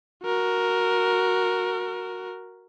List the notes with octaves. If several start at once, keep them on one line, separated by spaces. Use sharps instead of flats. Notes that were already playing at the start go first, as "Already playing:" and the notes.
F#4 A#4